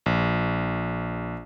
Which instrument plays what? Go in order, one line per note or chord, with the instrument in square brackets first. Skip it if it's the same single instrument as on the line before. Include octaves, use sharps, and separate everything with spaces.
[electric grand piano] A#1